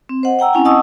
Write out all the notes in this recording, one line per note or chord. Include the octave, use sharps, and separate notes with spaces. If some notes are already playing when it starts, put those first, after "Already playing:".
C4
C5 D#5 F#5
F#5 G5 A#5 E6
C4 C#4 E4 F#5 G#5
D#5 F#5 A5 C#6 D#6 E6